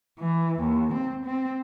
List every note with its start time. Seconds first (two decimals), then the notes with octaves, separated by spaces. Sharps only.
0.19 E3
0.60 D#2
0.94 C4
1.25 C4